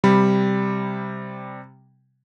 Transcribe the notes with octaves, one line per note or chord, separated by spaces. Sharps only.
C3 G3 B5